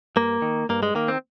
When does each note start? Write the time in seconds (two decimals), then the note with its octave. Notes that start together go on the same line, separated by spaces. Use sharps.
0.16 G2 A#3
0.42 D#3
0.69 G2 A#3
0.83 G#3
0.95 D#3 A#3
1.08 C4